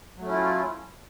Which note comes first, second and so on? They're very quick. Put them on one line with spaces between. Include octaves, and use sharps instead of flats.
F#3 A3 C#4 E4 F4